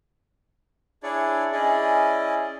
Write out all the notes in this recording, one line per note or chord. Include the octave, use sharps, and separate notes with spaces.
D4 E4 G#4 C#5 D5
C#4 E4 G#4 D5 D#5